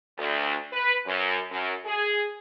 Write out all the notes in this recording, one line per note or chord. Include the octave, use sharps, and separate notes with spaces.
D2
B4
F#2
F#2
G#4